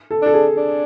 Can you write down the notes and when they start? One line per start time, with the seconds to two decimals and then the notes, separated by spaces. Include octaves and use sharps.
0.11 A4
0.22 D4 A4
0.34 G#4
0.57 D4